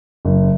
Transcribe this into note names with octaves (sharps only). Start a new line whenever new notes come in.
F#1